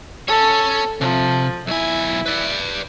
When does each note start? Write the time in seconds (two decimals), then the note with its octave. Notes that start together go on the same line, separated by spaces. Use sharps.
0.28 C#4 A4 C#5
1.01 C3 F3
1.67 B1 E4 G#5
2.26 B4 D5